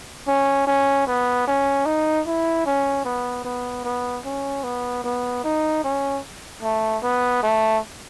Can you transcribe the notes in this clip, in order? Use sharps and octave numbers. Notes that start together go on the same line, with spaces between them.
C#4
C#4
B3
C#4
D#4
E4
C#4
B3
B3
B3
C#4
B3
B3
D#4
C#4
A3
B3
A3